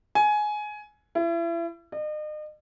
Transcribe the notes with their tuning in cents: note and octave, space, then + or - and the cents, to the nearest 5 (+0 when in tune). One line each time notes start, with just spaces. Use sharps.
G#5 +15
E4 +35
D#5 -40